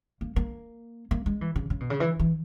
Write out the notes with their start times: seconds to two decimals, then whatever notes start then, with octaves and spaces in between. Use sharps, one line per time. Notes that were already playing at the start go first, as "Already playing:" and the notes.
0.21 A#3
0.36 A#3
1.11 A#3
1.26 G#3
1.41 E3
1.56 C#3
1.70 C#3
1.80 B2
1.90 C#3
2.00 E3
2.19 E3